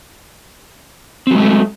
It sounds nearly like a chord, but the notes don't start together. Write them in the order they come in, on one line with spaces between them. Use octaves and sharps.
C4 F#3 G#3 A3